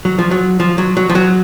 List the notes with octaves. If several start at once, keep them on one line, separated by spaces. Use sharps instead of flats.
F#3
F3
F#3
F3
F#3
F#3
F3
F#3